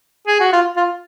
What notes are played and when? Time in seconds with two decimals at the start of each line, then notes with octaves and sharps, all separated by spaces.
0.28 G#4
0.40 F#4
0.53 F4
0.77 F4